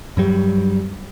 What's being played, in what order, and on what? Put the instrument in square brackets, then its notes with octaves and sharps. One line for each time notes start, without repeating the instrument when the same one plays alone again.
[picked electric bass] G2 F#3 G3